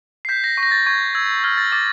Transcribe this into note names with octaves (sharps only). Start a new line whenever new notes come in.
C7
G6 B6
A#6
C#6
A#6
A6
C#6 G#6
E6 G#6
F6 G#6
A6
D6 A6